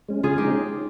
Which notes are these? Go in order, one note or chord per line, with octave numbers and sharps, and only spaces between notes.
G#3 C#4
C#3 F4 G#4
G#3 C#4 D#4 G4